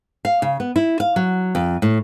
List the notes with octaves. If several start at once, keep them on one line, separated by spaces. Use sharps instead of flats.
F5
C#3
B3
E4
F5
F#3
F2
A2